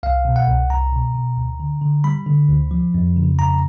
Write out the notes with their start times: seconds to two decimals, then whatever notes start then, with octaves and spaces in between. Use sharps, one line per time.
0.03 C2 F5
0.25 B2
0.36 F#5
0.48 C2
0.70 C2 A#5
0.92 B2
1.15 B2
1.37 D2
1.60 D3
1.82 D3
2.04 G3 B5
2.26 D3
2.49 D2
2.71 F3
2.94 F2
3.16 C#3
3.39 F2 A#5